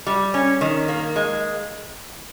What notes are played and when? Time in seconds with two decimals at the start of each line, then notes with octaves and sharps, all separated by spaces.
0.07 G3
0.34 C#4
0.61 D#3
0.88 A#3
1.16 G#3